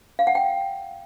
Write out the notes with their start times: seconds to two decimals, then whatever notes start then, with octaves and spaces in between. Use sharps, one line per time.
0.19 F5
0.27 F#5
0.35 G5